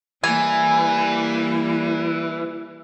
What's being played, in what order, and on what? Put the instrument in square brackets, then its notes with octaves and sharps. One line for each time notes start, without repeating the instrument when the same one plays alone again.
[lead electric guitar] E3 [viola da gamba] G3 A#3 [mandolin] G#5